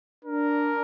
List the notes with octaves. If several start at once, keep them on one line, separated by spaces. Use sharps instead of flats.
D4 A#4